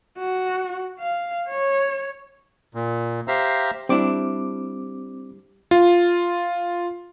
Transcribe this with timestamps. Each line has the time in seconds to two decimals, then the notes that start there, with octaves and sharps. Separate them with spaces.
0.18 F#4
0.99 F5
1.49 C#5
2.75 A#2
3.28 G4 C5 E5 F5 A#5 E6
3.89 G3 C4 D4 E4 D6
5.71 F4